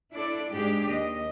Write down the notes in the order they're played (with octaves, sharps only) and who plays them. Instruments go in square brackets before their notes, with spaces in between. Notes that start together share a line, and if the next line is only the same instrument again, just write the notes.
[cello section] D4 E4 A4 D5
G#2 D4 G4 G#4
D#2 D#5